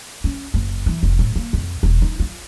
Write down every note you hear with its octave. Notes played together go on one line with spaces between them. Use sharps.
C#4
F#1
E3
F1
A2
A#3
F2
E1
D#4
F4